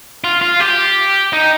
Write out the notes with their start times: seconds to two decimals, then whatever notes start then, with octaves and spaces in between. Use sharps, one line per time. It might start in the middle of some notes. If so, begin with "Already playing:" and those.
0.24 F4
0.42 F4
0.60 G4
1.33 D#4